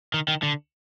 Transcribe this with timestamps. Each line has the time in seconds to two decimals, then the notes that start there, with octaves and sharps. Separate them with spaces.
0.14 D#3
0.28 D#3
0.43 D3